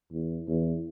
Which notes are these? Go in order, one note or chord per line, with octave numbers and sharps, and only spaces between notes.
E2
E2